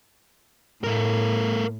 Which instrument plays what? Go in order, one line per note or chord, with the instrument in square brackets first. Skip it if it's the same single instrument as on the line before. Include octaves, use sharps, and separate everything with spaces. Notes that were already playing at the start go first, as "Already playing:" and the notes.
[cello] A2 [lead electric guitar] A3 A#4